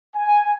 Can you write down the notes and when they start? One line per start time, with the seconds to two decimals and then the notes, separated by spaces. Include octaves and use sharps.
0.16 G#5